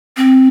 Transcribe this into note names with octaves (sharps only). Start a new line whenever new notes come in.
C4